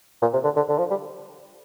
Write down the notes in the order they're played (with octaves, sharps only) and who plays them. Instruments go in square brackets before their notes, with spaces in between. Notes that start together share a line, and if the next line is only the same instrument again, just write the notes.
[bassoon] A#2
C3
D3
D3
D3
F3
G3